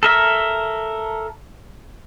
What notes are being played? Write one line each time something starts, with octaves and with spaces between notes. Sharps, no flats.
A4 A#4 E5